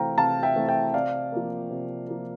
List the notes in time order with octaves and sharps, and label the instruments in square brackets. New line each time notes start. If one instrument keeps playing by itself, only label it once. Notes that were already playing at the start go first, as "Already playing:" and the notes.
Already playing: [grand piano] C3 E3 A3 C4 F5 G5 A#5
C3 F5 A5
E5 G5
E3 A3 C4
E5 G5
C3 D5 F5
F3 A#3
C3
F3 A#3